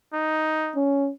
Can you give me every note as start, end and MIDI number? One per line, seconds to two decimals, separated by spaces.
0.13 0.76 63
0.76 1.11 61